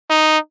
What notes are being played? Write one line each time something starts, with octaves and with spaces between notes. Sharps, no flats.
D#4